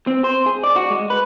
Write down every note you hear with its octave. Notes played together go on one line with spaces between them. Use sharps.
C4
C5
G#4
D5
F#4
G#3
B4